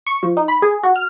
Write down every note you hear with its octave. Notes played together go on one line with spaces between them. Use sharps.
C#6
F3
D#4
B5
G#4
F#4
F6